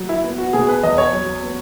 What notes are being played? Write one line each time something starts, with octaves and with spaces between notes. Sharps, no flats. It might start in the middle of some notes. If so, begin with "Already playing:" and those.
Already playing: F#3
E4
B3
F#4
B2 G#4
B4
E2 D#5
C#5
F#3
B3